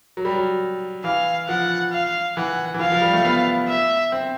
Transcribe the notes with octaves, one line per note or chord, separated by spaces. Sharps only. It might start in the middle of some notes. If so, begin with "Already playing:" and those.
F#3
G3
F#3
E3 F5
F3 F#5
F5
E3 F#5
E3
F3 F5
F3
G3
A3
B3
E5
C4